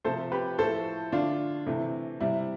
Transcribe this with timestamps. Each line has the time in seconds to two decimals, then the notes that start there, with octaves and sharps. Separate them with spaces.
0.05 C3 F3 A3 A4 C5
0.32 G4 B4
0.58 A2 F3 A3 A4 C5
1.12 D3 A3 D4 F4
1.66 C3 E3 A3
2.20 C3 G3 E4